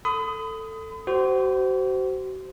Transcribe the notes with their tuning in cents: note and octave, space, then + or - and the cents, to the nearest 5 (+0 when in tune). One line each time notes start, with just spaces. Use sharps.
A4 +15 B5 +40 D#6 +10
F#4 +40 C5 -15